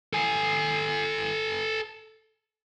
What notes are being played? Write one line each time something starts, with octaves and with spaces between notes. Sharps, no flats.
A4 G#5